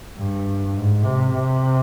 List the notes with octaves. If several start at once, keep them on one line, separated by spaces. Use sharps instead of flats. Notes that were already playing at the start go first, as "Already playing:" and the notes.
G2
G#2
C3
C3